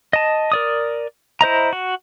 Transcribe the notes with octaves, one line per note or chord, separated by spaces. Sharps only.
D#5 A5
A#4 D5 D#6
E4 C5 D#5 A#5
F#4